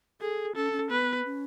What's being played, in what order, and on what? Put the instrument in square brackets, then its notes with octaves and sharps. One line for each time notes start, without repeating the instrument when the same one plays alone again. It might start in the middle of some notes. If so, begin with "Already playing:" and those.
[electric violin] G#4 [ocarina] A4
[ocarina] C#4 [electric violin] A4
[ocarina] C#4
[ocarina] B3 [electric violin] B4
[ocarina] C#4